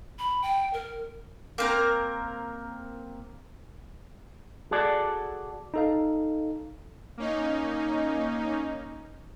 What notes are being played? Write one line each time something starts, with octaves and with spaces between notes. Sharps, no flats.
B5
G5
A#4
A#3 C4 A#4
F#4 G#4 A4 D5
D#4 A4 F5
A#3 C#4 D#4